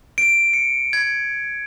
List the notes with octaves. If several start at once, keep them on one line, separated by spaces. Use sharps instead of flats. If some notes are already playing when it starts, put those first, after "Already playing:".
D7
C#7
G#6